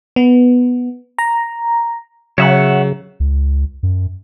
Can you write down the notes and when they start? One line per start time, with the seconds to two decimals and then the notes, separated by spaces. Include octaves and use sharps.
0.16 B3
1.19 A#5
2.38 C#3 F#3 C#5 E5 F#5
3.20 C#2
3.83 F#2